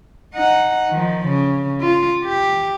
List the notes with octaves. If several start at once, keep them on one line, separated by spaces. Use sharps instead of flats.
D#4 F#5
D#3 F3
C#3
F4
G4